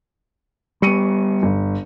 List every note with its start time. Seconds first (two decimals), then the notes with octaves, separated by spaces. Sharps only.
0.82 G3 B3 C#6 C#7 D#7
1.43 G1